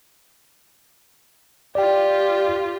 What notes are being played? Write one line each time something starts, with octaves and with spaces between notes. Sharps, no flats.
F4 G4 D5 G5